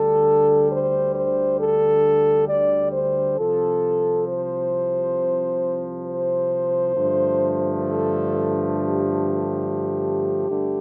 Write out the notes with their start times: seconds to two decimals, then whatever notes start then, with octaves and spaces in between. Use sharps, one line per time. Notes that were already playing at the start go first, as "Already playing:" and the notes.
Already playing: D2 D3 G3 A4
0.71 C5
1.14 C5
1.59 A4
2.48 D5
2.93 C5
3.37 C2 C3 F3 A4
4.26 C5
6.04 C5
6.94 G2 D3 F3 A3
7.82 A4
8.71 G4
10.49 G1 G2 D3 A3